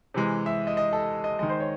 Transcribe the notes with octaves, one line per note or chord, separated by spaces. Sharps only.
C3 E3 G#3
E5
D#5
D#5
A4
D#5
D#3 G#3 D#5
C5
C#5